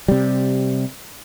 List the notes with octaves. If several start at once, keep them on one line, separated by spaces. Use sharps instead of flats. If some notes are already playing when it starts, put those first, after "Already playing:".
C3 G3